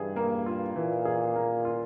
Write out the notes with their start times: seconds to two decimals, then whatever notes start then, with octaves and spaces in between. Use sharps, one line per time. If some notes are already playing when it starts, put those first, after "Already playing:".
Already playing: G2 E3 G#4
0.16 A#3
0.46 F4
0.76 A#2 E3
1.05 G#4
1.36 A#3
1.65 F4